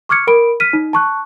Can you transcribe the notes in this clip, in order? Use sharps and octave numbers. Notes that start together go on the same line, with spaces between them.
C#6 D6 F6 G#6 C#7
A#4 B5 D7
F6 B6 D#7
D#4
A5 C#6 F#6